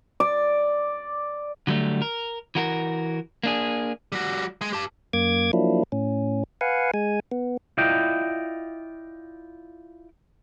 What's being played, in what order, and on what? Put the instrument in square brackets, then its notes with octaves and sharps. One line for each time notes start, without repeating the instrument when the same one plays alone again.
[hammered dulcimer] D5
[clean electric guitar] D3 F#3 G3 A3
A#4
E3 F#4 A#4
A#3 D4 G#4
[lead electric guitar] G3 F#4
G#3 G#4
G4 A5
[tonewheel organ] F#2 A#3 D6 G#6
F3 F#3 A#3 D4 E4
A2 C#4
B4 F5 F#5 G#5
G#3 G#5
B3
[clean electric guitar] E4 F4 D5 D#5 G5